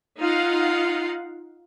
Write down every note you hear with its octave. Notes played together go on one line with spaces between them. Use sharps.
D#4 F4 F5 F#5